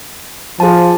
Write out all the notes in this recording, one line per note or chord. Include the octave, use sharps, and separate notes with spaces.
F3 G#4 A5